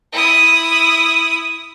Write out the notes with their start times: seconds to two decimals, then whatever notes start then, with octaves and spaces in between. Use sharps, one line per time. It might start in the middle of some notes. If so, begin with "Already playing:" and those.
0.12 E4 D#6